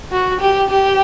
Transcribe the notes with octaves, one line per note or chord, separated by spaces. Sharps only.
F#4
G4
G4